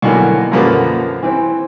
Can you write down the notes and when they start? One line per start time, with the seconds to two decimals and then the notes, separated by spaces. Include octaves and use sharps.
0.02 B2 D3 E3 F#3 A#3
0.52 F#2 B2 D3 F3 A#3 B3
1.23 E3 C4